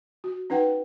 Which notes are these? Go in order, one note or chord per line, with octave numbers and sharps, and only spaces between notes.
F#4
C#4 D#4 B4 F#5 G5